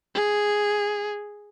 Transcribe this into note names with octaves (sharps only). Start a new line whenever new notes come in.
G#4